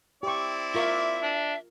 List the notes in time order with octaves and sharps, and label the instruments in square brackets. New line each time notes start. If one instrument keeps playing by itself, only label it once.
[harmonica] C4 E4 D5 [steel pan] G4 C#6
[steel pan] F4 A#4 C#6 [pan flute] E5
[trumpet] D4